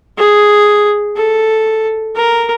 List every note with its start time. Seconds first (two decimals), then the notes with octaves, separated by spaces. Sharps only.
0.18 G#4
1.17 A4
2.16 A#4